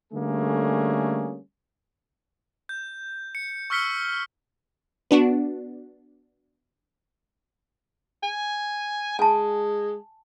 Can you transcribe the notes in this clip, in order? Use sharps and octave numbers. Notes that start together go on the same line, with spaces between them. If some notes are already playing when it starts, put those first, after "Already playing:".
D3 G3 A3 A#3 C#4 G#4
G6
C#7
C#6 E6 F6 B6 C#7 G7
B3 D4 F#4
G#5
G#3 G#5 A5